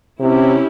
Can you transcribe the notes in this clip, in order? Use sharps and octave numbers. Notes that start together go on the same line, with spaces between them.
C3 C#4 E4 G4